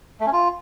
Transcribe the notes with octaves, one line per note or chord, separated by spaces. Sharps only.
A3
C#4
F4